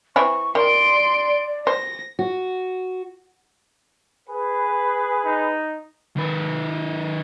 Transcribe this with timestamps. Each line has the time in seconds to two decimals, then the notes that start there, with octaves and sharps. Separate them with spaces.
0.16 E3 C4 E4 C#6
0.55 D#3 D5 C6 D7
1.67 C5 A#6
2.19 F#4
4.29 G#4 B4
5.25 D#4
6.17 D#3 B4